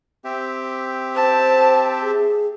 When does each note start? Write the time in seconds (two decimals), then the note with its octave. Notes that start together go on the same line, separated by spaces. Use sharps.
0.25 C4 G4 E5
1.16 C5 A5
2.02 G#4